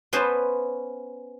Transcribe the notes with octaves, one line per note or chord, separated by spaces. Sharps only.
B3 C#4 B4 C5 E5 A5